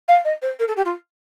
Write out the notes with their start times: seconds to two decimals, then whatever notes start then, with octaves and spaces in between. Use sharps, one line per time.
0.08 F5
0.25 D#5
0.42 C5
0.59 A#4
0.68 A4
0.77 G4
0.85 F4